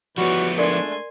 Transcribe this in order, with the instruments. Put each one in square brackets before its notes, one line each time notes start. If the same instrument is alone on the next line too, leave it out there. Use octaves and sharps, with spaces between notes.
[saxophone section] E3 G3 F#4 [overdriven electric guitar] F3 B3 [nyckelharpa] C#5
[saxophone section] G#3 A3 D4 [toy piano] A#4 D5 [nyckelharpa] G#5 C6